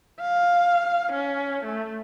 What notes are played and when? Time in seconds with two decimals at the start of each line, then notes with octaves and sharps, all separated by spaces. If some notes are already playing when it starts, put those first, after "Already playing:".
0.21 F5
1.12 C#4
1.64 A3